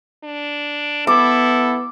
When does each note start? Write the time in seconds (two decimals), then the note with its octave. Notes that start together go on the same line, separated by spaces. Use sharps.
0.24 D4
1.07 B3 E4 A4 D6